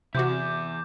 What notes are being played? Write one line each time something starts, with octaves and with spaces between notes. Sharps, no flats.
E2 C3 E4 F#4 D6 G6